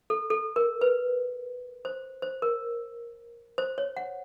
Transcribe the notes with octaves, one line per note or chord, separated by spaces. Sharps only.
A4
A4
A#4
B4
C5
C5
A#4
C5
C#5
F#5